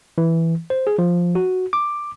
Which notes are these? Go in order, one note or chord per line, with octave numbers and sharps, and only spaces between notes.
E3
C5
G#4
F3
F#4
D6